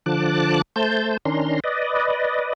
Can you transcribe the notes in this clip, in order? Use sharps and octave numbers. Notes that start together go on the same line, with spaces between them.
D3 F3 A5 D6 F#6
A3 C5 A5 G6
D#3 C#4 D4 A#5 C6
B4 D5 D#5